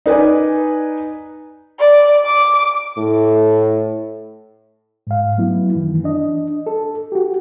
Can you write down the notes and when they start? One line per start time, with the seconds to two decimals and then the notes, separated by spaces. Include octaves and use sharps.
0.06 D#4 B4 D5 G#5
1.79 D5
2.25 D6
2.98 A2
5.07 G#2 F5
5.38 F#3 A3 B3 E4
5.75 F#2 D#3 E3
6.04 D4 D#5
6.67 A4
7.12 F#4 G4